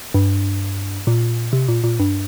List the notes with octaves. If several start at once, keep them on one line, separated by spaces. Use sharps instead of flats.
G2
A#2
C3
A#2
A#2
G2